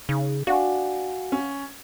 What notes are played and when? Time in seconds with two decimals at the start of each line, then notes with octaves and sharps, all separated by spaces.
0.09 C#3 D#4
0.47 D4 F#4 F5 F#5 G#5
1.32 C#4